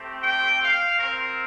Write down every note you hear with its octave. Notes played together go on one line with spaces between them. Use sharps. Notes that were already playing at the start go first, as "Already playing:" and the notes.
Already playing: A3 C4 G4
G5
F5
C4 F4 A#4